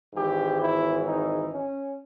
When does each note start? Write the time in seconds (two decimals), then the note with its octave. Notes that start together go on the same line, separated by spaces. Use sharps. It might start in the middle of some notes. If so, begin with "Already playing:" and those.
0.14 G#1 G#2 E3 G4
0.60 E4
1.05 D#4
1.49 C#4